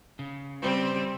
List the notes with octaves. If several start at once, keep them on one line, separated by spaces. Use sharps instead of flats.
C#3
G3 C4